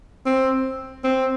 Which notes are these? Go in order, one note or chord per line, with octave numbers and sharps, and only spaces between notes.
C4
C4